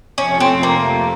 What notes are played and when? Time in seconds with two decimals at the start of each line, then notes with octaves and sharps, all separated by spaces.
0.18 F2 C3 F3 A3 C#4
0.40 C4
0.63 A#3